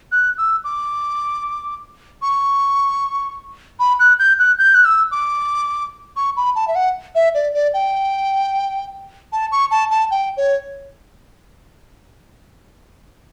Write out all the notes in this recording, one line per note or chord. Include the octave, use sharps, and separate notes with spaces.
F#6
E6
D6
C#6
B5
F#6
G6
F#6
G6
F#6
E6
D6
C#6
B5
A5
E5
F#5
E5
D5
D5
G5
A5
C#6
A5
A5
G5
C#5